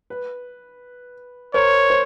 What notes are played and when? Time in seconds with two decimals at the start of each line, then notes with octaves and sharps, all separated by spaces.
0.10 B4
1.54 A#4 C5 C#5
1.90 C5